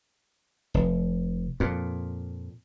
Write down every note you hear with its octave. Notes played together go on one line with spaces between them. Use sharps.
F1
F2 A#2